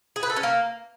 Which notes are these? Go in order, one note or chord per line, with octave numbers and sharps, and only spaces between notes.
G#4
B4
A4
C#4
A#3